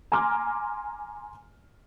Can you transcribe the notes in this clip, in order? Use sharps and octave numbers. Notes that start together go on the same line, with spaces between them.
G#5 A#5 C6 D6 F6